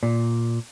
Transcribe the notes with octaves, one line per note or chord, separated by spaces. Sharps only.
A#2